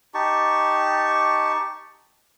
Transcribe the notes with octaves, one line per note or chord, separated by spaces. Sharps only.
D#4 G4 A5 C#6